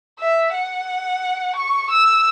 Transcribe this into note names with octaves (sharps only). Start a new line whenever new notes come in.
E5
F#5
C#6
E6